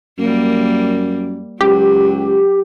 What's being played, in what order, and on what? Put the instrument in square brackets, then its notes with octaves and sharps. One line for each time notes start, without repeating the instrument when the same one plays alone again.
[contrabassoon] F#2 [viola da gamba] G3 A#3
[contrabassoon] C#2 [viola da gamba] F#3 [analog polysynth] G4